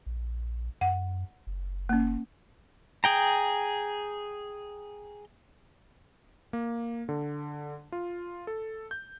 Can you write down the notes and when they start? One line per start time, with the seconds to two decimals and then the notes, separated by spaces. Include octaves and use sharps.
0.06 A#1
0.81 F#2 F#5
1.47 F#1
1.89 A#3 C#4
3.04 G#4 G5 A#5
6.53 A#3
7.09 D3
7.92 F4
8.47 A4
8.91 G6